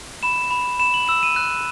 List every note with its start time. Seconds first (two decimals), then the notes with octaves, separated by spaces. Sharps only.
0.23 B5 E7
0.51 B5
0.79 B5 E7
0.94 F#7
1.08 E6 E7
1.23 D#7
1.36 F#6